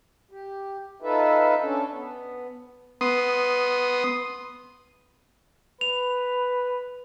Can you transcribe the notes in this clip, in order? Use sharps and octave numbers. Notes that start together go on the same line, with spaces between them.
G4
D#4 F4 A4 B4 E5
C#4 D4 A4
B3
B3 C6 D#6
B4 F7